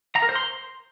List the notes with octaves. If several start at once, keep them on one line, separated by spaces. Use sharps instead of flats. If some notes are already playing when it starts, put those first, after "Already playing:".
A#5
A#4
C5
C6